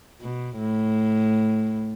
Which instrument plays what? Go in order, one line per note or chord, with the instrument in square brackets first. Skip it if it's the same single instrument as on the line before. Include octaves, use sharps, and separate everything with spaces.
[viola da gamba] B2
A2